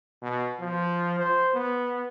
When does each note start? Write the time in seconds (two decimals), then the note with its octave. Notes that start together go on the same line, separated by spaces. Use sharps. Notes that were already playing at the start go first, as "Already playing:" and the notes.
0.22 B2
0.60 F3
1.19 C5
1.55 B3